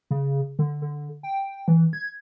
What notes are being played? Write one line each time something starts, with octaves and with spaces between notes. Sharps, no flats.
C#3
D3
D3
G5
E3
G#6